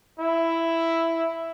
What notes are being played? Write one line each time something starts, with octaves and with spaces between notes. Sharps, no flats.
E4